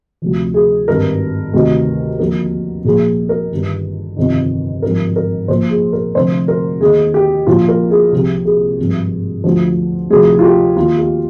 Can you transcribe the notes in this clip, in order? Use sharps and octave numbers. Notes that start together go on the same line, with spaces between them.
D2 C3 F3
G#4
G#1 G2 D#3 A#4
D2 C3 D#3
D#2 D3 F3 A#4
A#1 A#2 F3 G#4
A#4
G1 G2 D#3
G1 F2 C3 D#3
G#1 G2 D3 F3 A#4
A#4
A#1 A#2 F3 C5
G#4
A#4
F1 F2 D3 F3 C5
A#4
D#2 D#3 G#4
G4
A#1 A#2 F3 F4
A#4
G#4
C2 C3 F3 G4
G#4
G#1 G2 F3
D2 D3 F3
D2 C3 F3 G#4
F4
G4
D#2 D#3 F4
G4